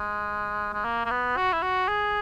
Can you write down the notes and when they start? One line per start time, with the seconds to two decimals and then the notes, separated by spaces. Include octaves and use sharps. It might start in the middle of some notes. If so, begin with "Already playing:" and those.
Already playing: G#3
0.73 G#3
0.85 A#3
1.05 A#3
1.11 B3
1.37 F#4
1.53 E4
1.62 F#4
1.88 G#4